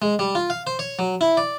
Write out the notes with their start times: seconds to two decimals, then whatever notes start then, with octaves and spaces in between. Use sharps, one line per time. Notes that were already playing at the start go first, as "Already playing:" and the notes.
0.02 G#3
0.19 G3
0.35 F4
0.50 F5
0.67 C5
0.79 C#5
0.99 F#3
1.21 E4
1.37 D5